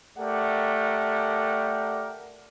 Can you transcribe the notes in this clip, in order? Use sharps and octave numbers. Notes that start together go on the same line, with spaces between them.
A3 G4 A#4 D5 F#5